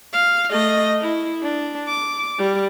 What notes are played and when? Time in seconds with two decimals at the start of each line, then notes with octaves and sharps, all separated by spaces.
0.13 F5
0.51 A3 D#5
1.01 E4
1.43 D4
1.88 D6
2.38 G3